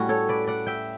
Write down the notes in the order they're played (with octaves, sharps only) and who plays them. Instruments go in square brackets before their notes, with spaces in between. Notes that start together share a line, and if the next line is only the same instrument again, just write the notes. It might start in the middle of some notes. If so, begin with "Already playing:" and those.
Already playing: [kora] A2 G3 C#4 F#4
A4 C#5
B4 D5
D5 F#5
E5 G5